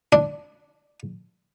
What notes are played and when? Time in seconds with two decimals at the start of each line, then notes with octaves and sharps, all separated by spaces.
0.13 D4